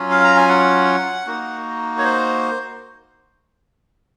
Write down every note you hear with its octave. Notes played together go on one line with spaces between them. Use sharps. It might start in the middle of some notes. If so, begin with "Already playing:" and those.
Already playing: F#3 C#4 F4
F5
A#5
G#5
F#5
A#3 D#4 F#4
C#5
C5